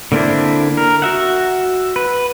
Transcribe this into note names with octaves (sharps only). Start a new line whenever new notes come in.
D3 A#3 C4 D4 E4
A#4
F#4 E5 F#5
B4